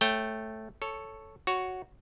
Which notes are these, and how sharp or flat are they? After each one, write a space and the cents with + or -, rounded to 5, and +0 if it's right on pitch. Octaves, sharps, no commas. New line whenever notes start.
A3 -5 C#5 -15 G5 +0
A4 +0 C#5 +0
F#4 +0 C#5 +0